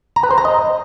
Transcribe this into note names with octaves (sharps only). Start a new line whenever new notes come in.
A#5
B4
C5
A#5
D#5